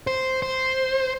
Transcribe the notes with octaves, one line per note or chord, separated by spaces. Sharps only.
C5
C5